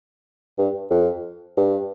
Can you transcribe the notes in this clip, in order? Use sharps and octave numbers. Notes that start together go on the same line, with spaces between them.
G2
F2
G2